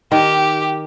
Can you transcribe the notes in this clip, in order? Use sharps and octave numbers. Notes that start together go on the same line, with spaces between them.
D#3 G4